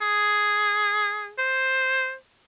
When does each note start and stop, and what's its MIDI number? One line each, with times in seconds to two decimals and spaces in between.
0.01 1.33 68
1.38 2.14 72